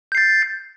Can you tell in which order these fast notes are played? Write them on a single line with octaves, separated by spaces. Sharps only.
G6 C7 A6